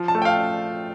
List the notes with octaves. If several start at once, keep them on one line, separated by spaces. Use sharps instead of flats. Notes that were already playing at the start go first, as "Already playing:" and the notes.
Already playing: F3
A5
A3
G5
F5